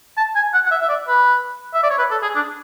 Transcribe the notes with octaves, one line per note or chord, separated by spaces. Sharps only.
A5
G#5
F#5
F#5
E5
E5
D5
B4
E5
D5
C#5
B4
A4
G#4
D4